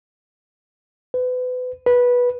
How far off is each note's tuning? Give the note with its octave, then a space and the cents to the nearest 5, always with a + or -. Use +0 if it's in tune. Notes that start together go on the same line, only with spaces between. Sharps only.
B4 +30
B4 -15